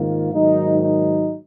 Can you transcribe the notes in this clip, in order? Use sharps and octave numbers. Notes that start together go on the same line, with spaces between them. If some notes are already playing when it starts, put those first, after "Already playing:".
Already playing: G#2 D#3 A#3 F4
G#2 D#3 F#3 A#3 D#4
D#4